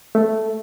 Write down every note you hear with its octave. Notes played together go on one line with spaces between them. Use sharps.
A3